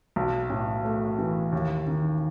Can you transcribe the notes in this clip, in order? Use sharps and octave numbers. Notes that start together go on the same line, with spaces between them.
B1
A2
A3
E3
D#2
D#3